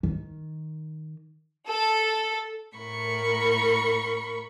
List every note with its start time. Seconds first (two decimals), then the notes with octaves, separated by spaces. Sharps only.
0.03 D#3
1.67 A4
2.77 A2 A#4 B5 C#6